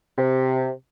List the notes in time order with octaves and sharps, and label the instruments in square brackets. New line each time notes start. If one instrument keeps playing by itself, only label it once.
[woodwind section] C3